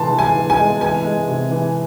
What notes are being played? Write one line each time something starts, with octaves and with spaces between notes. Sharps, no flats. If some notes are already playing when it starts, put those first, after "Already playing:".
Already playing: C3 E3 G#3 A5 C6
E3
G#5
E3
G#5
G#3
E3 G#5
G#3
C3
E3